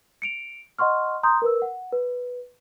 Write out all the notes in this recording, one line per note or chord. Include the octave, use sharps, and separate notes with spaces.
C#7 D7 F7
D#5 F#5 C6 C#6 F6
A#5 C6 D#6 G6
A#4 B4 E6
F#5
B4